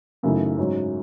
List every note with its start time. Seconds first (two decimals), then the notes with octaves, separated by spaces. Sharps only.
0.23 F#2 C#3 E3 A3 D#4
0.58 G#2 F#3 C#4